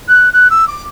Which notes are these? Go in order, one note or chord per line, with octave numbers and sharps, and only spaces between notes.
F#6
F#6
E6
D6